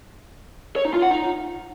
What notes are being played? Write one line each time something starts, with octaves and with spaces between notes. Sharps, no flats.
C#5
D#4
F4
F#5
D#4